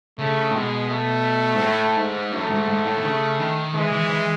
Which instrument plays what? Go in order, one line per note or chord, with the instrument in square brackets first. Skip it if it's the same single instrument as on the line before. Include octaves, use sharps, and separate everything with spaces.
[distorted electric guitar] C#3 [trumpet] A3
[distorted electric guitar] A2
[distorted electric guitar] B2 [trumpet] G#3
[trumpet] A3
[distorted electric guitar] G#2
A2
G#2
[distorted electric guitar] F#2 [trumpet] A3
[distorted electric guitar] G#2
G#2
A2
D#3
C#3
D#3
[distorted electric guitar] E3 [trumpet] G#3
[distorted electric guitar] E3
E3